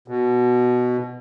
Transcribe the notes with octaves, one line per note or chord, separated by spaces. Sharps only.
B2